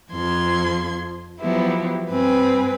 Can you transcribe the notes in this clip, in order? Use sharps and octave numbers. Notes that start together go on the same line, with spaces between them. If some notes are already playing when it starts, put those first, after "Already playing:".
F2 F3 C6 G#6
F3 F#3 B3 E4 G4
G2 C4 B4 G#5